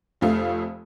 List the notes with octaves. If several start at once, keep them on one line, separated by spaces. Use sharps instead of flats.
F1 F2 A3 F5